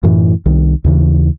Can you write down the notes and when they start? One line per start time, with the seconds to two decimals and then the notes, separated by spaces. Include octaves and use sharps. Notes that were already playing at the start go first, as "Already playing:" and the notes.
0.03 F#2 A2 E3
0.46 C2 D#3
0.84 D#2 C#3 E3